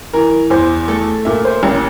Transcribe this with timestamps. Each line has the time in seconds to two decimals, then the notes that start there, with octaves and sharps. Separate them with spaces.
0.13 E3 A#4
0.50 E2 C5
0.88 A3 A4
1.25 A#2 E5
1.45 C5
1.63 A1